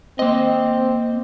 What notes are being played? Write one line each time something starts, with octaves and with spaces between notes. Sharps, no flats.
A#3 C4 D#5